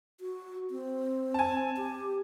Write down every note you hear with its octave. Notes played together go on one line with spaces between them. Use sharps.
F#4
C4
G#5 A5
G4